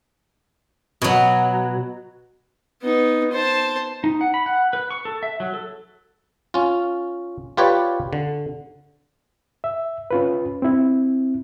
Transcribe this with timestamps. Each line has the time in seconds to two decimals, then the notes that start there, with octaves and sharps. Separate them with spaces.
1.02 B2 F#3
2.82 B3 D#4
3.32 C5 A5
4.04 D#4
4.21 F#5
4.34 B5
4.46 F#5
4.73 B4
4.91 C#6
5.05 A4
5.23 E5
5.40 F#3
5.54 A4
6.54 C#4 F4
7.57 F4 G4 B4 C#5 D5
8.13 D3
9.64 E5
10.11 C#4 F4 B4
10.62 C4 E4